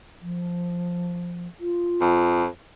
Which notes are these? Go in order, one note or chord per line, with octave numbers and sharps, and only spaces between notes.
F3
F4
F2